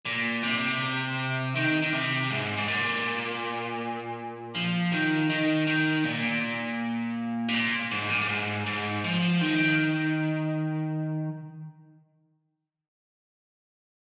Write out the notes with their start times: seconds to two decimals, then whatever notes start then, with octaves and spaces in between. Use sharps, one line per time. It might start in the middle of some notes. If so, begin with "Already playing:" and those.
0.05 A#2
0.43 C3
1.55 D#3
1.82 D#3
1.93 C3
2.30 G#2
2.57 G#2
2.68 A#2
4.55 F3
4.92 D#3
5.30 D#3
5.67 D#3
6.04 A#2
7.48 C3
7.54 A#2
7.91 G#2
8.10 A#2
8.29 G#2
8.66 G#2
9.04 F3
9.41 D#3